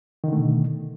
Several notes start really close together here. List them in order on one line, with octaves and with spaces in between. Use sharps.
D#3 D3 A3 B2